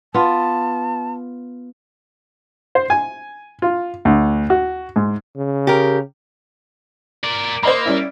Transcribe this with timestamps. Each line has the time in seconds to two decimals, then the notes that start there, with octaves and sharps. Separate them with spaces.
0.14 B3 F4 A5
2.75 C5
2.90 G#5
3.62 F4
4.05 D2
4.50 F#4
4.96 G#2
5.37 C#3
5.67 G4 A#4
7.24 A#4 D5
7.63 A#3 C5 D#5 B5
7.86 G3 C#4 E4